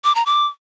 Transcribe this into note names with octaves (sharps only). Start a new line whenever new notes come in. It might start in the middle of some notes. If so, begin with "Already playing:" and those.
D6
A#5
D6